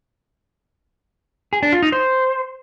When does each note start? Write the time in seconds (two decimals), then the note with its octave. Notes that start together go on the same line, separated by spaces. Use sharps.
1.53 G#4
1.63 D4
1.73 F4
1.82 D#4
1.92 C5